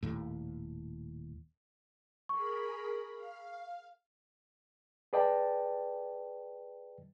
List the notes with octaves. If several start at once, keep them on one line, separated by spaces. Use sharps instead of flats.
D#1 D#2 A2
G#4 A#4 B5 C#6
F5
G#4 B4 D5 D#5 G5 A5